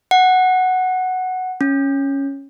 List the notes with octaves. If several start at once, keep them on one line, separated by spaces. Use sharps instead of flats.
F#5
C#4